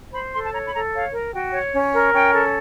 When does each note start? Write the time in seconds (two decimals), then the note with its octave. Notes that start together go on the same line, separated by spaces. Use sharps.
0.13 C5 B5
0.33 A4 C6
0.44 A5
0.53 C#5 A#5
0.67 B5
0.74 A4 A#5
0.93 C#5 F5
1.13 A#4
1.34 F#4 G5
1.54 C#5
1.74 C#4
1.94 A#4
2.14 C#4 G5
2.34 A4